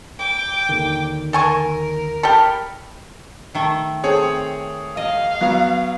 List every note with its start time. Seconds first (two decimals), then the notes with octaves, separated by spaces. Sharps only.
0.19 G5 D6
0.69 D#2 D3 D#3
1.33 A4 A#4 G#5 C#6
2.23 G4 A4 B5 F6
3.55 D#3 A3
4.04 C4 G#4 A4 C#5
4.97 D#5 F5
5.41 F#3 B3